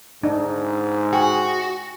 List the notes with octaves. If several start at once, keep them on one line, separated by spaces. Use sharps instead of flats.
G#2 D4 D#4
F#4 G#4 G5 G#5 C#6